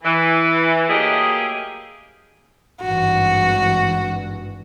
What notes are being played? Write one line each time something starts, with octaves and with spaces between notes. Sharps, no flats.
E3
F#3 A3 A#3 G4 G#4 D#5
G#1 G2 E3 F#4